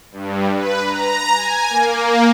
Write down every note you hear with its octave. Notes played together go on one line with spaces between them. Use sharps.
G2
B4
A#5
G#5
A#3